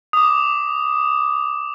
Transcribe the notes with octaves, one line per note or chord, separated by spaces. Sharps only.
D6 D#6